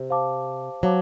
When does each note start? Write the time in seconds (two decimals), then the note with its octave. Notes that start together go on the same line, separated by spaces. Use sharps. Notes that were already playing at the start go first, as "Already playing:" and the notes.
Already playing: C3 C5
0.10 C5 F5 A5 D6
0.83 F#3 C5 F5 A5 D6